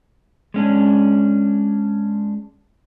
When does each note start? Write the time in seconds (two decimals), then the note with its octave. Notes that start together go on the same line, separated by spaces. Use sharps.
0.54 G#3 C#4 D4